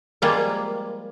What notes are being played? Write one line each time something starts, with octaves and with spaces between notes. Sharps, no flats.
F3 G3 G#3 A#3 F4